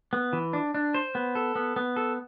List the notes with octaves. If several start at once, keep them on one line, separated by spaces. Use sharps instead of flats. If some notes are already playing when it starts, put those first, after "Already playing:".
B3
E3
D4
D4
C5
B3
A4
B3
B3
A4